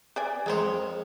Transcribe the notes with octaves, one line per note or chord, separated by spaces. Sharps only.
B4 D5 G#5
F2 G#3 G#4 A#4 C5 C#5